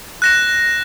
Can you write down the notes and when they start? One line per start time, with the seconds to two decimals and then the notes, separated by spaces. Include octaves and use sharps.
0.22 F#6 A#6 E7